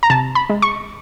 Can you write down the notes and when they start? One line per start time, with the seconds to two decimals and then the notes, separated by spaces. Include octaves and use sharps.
0.03 A#5
0.10 C3 A5
0.35 B5
0.50 G#3
0.62 C#6